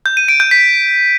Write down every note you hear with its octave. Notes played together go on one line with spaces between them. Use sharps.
G6
D#7
D7
G6
B6